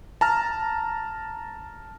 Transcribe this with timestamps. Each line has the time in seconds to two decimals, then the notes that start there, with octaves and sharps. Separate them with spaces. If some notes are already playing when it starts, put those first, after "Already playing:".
0.21 A5 A#5 F6